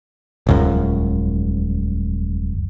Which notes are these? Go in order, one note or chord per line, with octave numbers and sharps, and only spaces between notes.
D#1 C#2 F#2